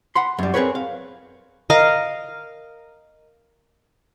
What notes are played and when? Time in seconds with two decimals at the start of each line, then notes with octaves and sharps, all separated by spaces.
0.15 F#5 B5 C6
0.39 F#2 G3
0.54 C4 G#4 A#4 B4 C#5
0.75 F5
1.70 A#4 D#5 F5